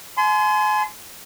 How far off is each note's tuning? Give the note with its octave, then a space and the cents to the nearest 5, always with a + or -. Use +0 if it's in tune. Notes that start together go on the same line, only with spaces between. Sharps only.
G#5 +35 C6 -25